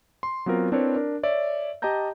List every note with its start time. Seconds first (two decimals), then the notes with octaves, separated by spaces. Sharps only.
0.23 C6
0.46 F#3 B3 C4 F4 A#4
0.72 C4 D4 E4 A#4 B4 C#5
0.96 D4 A#4
1.23 C#5 D5 E5
1.82 G4 D#5 G5 A5 A#5 G6